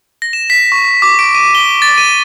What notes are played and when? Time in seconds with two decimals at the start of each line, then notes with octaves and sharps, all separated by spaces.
0.22 A#6
0.33 E7
0.50 B6
0.72 C#6
1.02 D6
1.19 D7
1.35 D#7
1.55 G7
1.82 A6
1.98 D#7